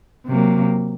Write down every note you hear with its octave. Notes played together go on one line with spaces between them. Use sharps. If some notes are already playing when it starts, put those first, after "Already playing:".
C3 F#3 A#3